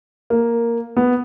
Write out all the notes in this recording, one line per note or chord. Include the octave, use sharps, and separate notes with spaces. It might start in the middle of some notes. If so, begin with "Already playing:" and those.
A#3
B3